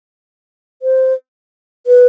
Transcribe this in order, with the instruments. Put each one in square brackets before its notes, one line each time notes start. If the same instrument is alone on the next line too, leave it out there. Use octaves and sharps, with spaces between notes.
[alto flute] C5
B4